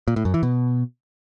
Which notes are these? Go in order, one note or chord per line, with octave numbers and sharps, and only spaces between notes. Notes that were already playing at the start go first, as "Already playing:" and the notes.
A#2
A2
F#2
E3
B2